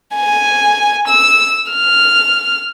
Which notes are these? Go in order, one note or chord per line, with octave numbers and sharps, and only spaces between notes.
G#5
E6
F6